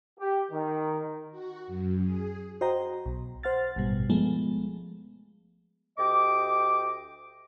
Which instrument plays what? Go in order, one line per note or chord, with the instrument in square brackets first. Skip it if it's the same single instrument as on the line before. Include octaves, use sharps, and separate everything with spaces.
[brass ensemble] G4
D#3
[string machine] F#4
F#2
G#4
[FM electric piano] F#4 C5 D#5 G5 A#5
B1
C5 F#5 F6 A6
A1 G2 B2 G3
F3 G#3 A3 B3
[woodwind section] D2 G4 D#5 D6